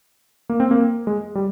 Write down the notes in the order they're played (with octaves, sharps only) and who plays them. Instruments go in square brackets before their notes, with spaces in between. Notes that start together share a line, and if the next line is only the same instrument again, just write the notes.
[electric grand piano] A#3
C4
A#3
G#3
G3